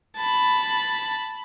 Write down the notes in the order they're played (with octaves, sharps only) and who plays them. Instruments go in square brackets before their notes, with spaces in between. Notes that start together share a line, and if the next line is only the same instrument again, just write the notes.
[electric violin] A5 B5